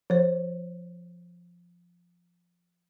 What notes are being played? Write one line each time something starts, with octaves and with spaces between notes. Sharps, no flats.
F3 C5